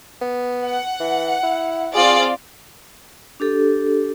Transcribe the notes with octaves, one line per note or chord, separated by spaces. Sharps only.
B3
F#5
E3
E4
C4 F4 G#4 D5
D4 G4 A4